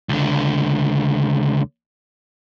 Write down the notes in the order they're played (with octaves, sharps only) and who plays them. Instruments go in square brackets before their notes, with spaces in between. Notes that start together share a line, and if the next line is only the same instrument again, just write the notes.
[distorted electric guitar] C#2 D3